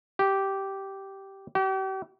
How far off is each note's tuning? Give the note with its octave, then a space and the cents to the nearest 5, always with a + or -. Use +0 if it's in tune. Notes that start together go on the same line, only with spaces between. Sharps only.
G4 -10
G4 -40